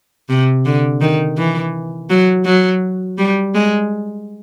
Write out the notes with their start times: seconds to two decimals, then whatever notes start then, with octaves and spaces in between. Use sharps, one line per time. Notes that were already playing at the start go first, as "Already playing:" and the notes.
0.29 C3
0.65 D3
1.01 D#3
1.37 E3
2.10 F#3
2.45 F#3
3.18 G3
3.55 G#3